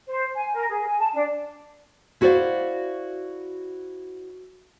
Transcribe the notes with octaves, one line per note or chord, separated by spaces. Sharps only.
C5
G#5
A#4
G#4
G#5
A5
D4
E4 F#4 A4 C5 D5 F5